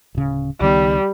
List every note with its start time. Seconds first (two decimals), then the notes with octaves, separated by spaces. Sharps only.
0.15 D1 C#3
0.61 C#2 D#3 G3 B3